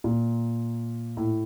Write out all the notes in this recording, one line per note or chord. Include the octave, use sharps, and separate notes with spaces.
A#2
A2